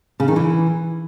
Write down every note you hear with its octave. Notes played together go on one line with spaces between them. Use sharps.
C#3
D#3
E3